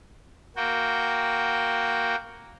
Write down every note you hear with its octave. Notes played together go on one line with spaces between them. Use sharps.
A#3 F#4 G5